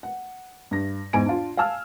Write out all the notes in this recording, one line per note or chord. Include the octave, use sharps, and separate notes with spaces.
F#5
G2 A#6
E2 G#2 G#5 D7
D4 F4
F5 G#5 A5 E6 F6